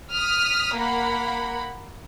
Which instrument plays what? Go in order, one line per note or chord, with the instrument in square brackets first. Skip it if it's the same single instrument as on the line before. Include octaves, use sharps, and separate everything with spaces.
[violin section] D#6 F6 B6
A#3 F#5 B5